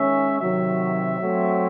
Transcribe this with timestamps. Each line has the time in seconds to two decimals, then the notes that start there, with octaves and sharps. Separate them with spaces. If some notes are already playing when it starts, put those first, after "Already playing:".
Already playing: D#3 G#3 C#4 E5
0.40 C3 D#3 F#3 E5
1.20 F#3 A3 C4